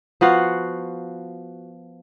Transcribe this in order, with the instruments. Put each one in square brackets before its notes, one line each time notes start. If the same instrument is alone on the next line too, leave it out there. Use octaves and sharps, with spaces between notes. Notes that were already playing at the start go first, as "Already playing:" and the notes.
[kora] F3 B3 F#4 F5